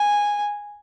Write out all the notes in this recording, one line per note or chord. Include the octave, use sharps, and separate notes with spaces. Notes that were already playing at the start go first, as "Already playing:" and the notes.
Already playing: G#5